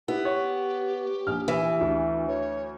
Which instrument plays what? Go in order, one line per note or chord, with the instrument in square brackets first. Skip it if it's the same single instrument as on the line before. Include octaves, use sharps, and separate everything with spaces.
[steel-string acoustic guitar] B3 [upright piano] E4 [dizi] G4
[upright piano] C#5
A#1 F6
[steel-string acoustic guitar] E3
[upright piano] D2
[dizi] C#5